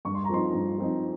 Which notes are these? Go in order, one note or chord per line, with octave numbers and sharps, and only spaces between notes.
G2 C#6
C6
A#5
F3 C4 D#4 C6
G2
F3 C4 D#4